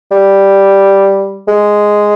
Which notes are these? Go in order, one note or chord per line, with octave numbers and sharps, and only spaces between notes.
G3
G#3